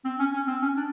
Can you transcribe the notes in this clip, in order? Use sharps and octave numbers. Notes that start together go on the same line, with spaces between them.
C4
C#4
C#4
C4
C#4
D4